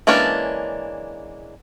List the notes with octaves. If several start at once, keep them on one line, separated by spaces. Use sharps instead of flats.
E3 G#3 A#3 C#4 D4